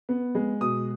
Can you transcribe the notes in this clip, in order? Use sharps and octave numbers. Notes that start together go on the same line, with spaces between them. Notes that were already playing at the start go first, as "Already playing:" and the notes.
B3
G#3
B2 D#6